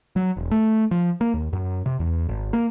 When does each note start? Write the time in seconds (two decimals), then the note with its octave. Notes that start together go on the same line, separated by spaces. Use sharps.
0.16 F#3
0.37 E1
0.51 A3
0.91 F3
1.21 A#3
1.34 D#2
1.53 F#2
1.86 C3
2.00 E2
2.29 G#1
2.53 A#3